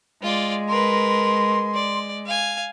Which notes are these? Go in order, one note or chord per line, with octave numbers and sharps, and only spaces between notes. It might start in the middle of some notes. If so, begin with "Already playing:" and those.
G#3 F4 D5
A#4 B4 C6
D5
F5 G#5